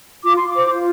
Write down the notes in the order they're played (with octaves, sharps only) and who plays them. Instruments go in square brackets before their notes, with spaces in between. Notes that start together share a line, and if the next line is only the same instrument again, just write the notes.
[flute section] F4 D6
F4 C6
D6
C5
F4